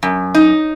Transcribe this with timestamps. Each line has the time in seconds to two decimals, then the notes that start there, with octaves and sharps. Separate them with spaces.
0.03 F#2
0.34 D#4